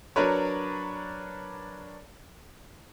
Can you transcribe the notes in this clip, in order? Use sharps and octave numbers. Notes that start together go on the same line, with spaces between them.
F#3 D4 A#4 B4 C#5